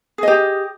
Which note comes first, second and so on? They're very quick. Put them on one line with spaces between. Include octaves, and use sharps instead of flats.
G#4 D#5 G4